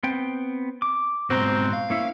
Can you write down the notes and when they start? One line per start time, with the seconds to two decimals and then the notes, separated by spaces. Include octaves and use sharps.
0.03 B3 C4 G5
0.82 D6
1.30 G#2 B2 C4 F#4 A#5 C6
1.73 F5
1.90 A#3 C#4 E4 E5